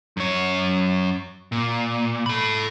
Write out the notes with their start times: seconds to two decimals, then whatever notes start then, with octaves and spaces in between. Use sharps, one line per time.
0.17 F#2 C#5
1.52 A#2
2.26 A4 B5